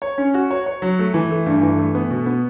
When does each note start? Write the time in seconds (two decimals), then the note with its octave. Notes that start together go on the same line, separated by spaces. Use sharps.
0.02 C#5
0.18 C#4
0.34 F#4
0.51 C#5
0.66 C#5
0.82 F#3
0.99 A3
1.14 E3
1.30 A3
1.46 G2
1.62 E3
1.79 A3
1.95 B3
2.11 B2
2.26 B3